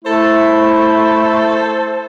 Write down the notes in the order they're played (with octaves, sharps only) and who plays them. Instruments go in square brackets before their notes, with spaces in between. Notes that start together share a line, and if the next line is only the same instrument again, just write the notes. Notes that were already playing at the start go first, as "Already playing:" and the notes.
[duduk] A3 [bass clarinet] E4 [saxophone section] A4 C5